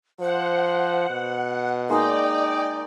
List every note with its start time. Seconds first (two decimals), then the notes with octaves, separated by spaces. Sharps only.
0.20 F3 C5 F#5
1.10 B2
1.89 G#3 A#3 D#4 D5 G5